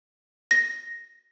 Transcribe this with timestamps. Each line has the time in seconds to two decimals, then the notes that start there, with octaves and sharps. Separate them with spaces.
0.51 A#6